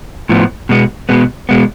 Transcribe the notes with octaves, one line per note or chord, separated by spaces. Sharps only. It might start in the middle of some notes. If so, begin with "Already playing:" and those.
A2 F3 B3
B2 G#3 B3
B2 G#3 B3
B2 G#3 B3